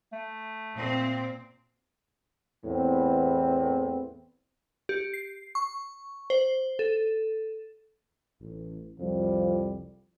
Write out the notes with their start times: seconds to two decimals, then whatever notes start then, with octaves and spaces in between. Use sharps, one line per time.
0.13 A3
0.74 A#2 C4
2.65 E2 A2 E3 B3 C4
4.89 G4
5.14 C7
5.55 C#6
6.30 C5
6.79 A4
8.40 A1
9.00 C2 F2 F3 G3